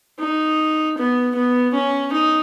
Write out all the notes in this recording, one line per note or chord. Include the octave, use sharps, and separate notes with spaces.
D#4
B3
B3
C#4
D#4